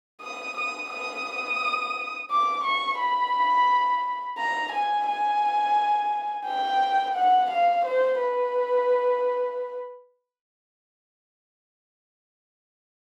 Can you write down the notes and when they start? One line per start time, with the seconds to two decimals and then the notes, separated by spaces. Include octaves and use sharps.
0.22 D#6
0.57 D#6
0.91 D#6
2.31 D6
2.65 C#6
2.99 B5
4.39 A#5
4.73 G#5
5.07 G#5
6.46 G5
7.15 F#5
7.51 F5
7.86 C5
8.20 B4